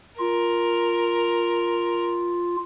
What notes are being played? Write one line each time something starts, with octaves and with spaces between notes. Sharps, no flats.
F4 A#4